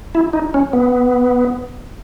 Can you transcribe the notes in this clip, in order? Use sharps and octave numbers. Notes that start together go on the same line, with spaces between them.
E4
D#4
C#4
B3